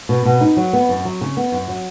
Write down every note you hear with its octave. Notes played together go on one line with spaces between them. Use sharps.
B2
B2
D#4
F#3
B3
F#2
F#3
C#3
B3
F#2
F#3